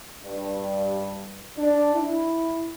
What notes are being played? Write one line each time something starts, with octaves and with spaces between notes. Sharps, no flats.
G2
D4
E4